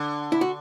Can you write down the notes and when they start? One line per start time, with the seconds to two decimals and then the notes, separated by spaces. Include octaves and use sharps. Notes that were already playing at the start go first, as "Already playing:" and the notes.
Already playing: D3
0.32 E4
0.41 F#4